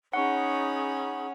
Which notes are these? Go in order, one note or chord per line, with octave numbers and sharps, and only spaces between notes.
C#4 D#4 G#4 F#5 B5 C#6